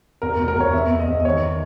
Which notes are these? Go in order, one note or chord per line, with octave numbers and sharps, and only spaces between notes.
E2 A#4
B2
A#4
E2 C#5
E2 E5
E2
D#5
E2
D#5
D#3 C#5
D#3